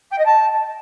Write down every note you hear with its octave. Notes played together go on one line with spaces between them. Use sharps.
G5
D#5
A5